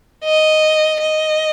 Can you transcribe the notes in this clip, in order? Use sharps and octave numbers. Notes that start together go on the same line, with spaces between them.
D#5
D#5